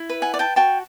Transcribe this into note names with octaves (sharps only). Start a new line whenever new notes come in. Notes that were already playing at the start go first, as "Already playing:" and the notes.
Already playing: E4
B4
F#5 G#5
D5
G5 A5
F#4 G5 A5